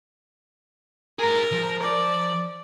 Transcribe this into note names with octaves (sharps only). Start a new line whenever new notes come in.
G#4 A#4 A#5
F3
D5